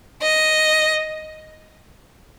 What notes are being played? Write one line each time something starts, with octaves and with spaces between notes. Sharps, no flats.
D#5